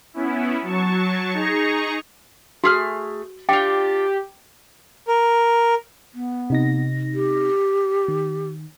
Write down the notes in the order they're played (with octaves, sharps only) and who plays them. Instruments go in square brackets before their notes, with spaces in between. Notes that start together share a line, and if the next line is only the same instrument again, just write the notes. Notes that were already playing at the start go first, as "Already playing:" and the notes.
[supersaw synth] B3 C#4 E4
F#3 A5 C#6
D#4 G#4 A#5 C#6
[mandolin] A3 G#4 F6 [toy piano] F#4
[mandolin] D4 F4 [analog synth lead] G4 [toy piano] G5
[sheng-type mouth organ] A#4
[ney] B3
[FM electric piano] C3 D#4 A#6
[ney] G4
[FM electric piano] D#3